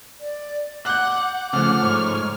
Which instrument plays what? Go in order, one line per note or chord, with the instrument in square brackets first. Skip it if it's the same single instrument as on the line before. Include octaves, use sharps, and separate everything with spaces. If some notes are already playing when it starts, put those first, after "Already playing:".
[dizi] D5
[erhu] F#5 [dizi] D6 [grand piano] F#6 G6
[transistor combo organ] C#3 F#5 [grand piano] F3 A3 [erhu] F6
[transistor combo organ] G#2 C#5